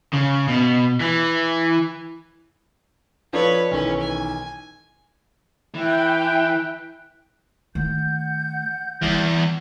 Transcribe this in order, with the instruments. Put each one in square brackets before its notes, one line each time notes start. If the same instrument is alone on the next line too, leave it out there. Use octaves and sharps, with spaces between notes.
[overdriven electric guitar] C#3
B2
E3
[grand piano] F3 D4 A4 [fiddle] B4 C#5
[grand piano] B1 D#3 E3 [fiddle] C#4 B4
[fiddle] G#5
[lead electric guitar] E3 [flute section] E5 F#6 [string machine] G5
[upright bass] D#3 A3 [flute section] F#5 G6
[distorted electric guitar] E2 [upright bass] E3 G3